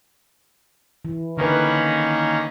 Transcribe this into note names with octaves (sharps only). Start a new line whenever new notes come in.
E3
D3 D#3 A#3 C#4 B4